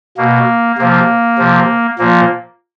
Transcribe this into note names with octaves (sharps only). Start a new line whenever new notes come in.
B2 A#3
C3 F3 A#3
C3 F3
A#2 F3 A#3